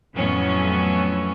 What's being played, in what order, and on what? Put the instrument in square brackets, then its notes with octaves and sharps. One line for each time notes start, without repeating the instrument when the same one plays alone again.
[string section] F2 A2 E3 F#3 B3 C#4